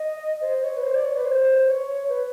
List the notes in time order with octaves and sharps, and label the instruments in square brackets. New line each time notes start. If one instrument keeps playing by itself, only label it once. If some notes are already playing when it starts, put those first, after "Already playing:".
Already playing: [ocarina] D#5
C5
C#5
B4
C5
D5
C#5
B4
C5
C#5
B4